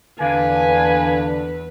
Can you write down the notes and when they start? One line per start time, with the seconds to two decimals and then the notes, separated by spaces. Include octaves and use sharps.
0.20 E2 D3 D4 B4 F5 G#5